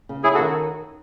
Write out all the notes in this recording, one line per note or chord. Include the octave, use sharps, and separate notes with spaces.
C#3
C#4 E4 G#4
F#4 A4
D#3